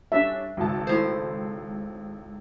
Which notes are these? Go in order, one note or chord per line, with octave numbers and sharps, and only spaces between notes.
G3 C#4 D4 E5
G#1 C#2 A5
A2 C5